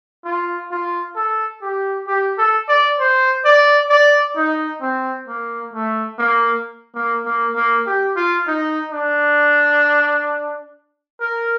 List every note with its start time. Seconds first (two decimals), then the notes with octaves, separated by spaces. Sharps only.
0.25 F4
0.71 F4
1.16 A4
1.62 G4
2.07 G4
2.38 A4
2.68 D5
2.99 C5
3.45 D5
3.90 D5
4.36 D#4
4.81 C4
5.28 A#3
5.73 A3
6.19 A#3
6.95 A#3
7.26 A#3
7.56 A#3
7.86 G4
8.16 F4
8.47 D#4
8.92 D4
11.21 A#4